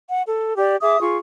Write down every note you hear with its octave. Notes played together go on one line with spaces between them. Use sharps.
F#5
A4
G4 D5
G#4 E5 D6 D#6
F4 G#4 C#6